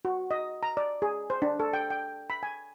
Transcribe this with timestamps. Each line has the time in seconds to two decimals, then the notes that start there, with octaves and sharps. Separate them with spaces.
0.05 F#4
0.31 D#5
0.63 A#5
0.77 D5
1.02 G#4
1.30 C5
1.42 D4
1.60 A4
1.73 G5
1.90 G5
2.30 B5
2.43 G#5